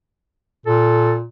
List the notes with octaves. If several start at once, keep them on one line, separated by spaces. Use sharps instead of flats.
A#2 A4